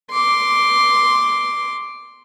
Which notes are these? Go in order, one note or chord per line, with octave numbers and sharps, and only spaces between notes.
C6 D6